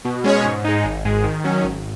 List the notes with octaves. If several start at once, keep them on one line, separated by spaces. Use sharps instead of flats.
B2
G#3 C#4 G#4 C#5
G#2
G#3 D#4
G#1
G#2 G#3
D#3
F#3 C#4
G#1